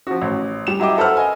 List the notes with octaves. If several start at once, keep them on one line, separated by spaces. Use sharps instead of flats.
F3 F#4
A1
G3 E7
F#3 E4 G4 D#5 D6
A4 B4 C5 F#5 E6 F6
D#5 G#5